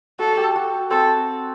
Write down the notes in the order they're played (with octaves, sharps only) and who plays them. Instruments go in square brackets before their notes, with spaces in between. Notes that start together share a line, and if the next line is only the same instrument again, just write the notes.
[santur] F#4 [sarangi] A4
[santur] G4
F#4
[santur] C4 [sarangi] A4